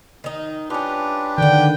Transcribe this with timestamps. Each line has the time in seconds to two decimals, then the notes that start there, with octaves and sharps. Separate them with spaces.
0.24 D#3 D#4
0.70 C#4 D4 F4 G4 B4
1.38 D3 D#3 D5 F#5 G5